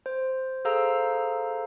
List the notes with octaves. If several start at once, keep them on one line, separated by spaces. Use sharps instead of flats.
C5
G#4 A4 C5 F5 A#5 E6